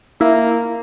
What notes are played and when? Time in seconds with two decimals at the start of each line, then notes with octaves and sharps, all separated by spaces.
0.21 A#3 E4